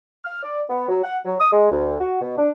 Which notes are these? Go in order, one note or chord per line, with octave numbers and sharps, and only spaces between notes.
F6
D5
B3
F#3
F#5
F#3
D#6
G#3
D2
F#4
B2
D4